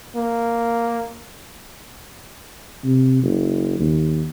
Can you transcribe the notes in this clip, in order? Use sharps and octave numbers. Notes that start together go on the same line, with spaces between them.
A#3
C3
F#1
D#2